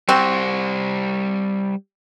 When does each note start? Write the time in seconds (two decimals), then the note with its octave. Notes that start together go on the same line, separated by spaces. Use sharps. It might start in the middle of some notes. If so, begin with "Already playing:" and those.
0.09 G3 C4 F#4 C5